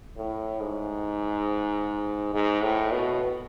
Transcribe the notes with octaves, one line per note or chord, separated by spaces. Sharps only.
A2
G#2
G#2
A2
B2